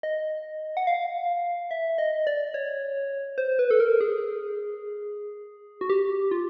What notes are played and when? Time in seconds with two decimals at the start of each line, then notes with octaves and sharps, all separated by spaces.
0.03 D#5
0.77 F#5
0.87 F5
1.71 E5
1.98 D#5
2.27 D5
2.54 C#5
3.38 C5
3.59 B4
3.71 A4
3.80 A#4
4.01 G#4
5.81 F#4
5.90 G4
6.31 F4